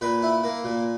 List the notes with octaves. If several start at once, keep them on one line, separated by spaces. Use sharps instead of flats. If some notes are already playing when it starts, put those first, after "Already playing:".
A#2 B4
E4
A#3
A#2